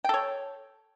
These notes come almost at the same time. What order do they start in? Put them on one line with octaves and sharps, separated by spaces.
G5 A4 C#5